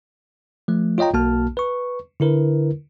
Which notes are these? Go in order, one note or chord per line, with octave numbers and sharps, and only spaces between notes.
F3 A3
F4 C#5 D#5 G5 A#5
B1 A#3 F#4 A5 F6
B4 C#6
D3 E4 A#4 B4